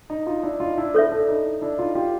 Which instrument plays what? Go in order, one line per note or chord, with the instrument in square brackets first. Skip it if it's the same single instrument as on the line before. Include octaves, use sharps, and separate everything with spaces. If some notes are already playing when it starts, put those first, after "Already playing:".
[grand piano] D#4
D#4 F4
D4 E4
D#4 F4
D4 E4
[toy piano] A4 C#5 E5
[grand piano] D4 E4
D#4
D4 E4
D#4 F4
F4 G4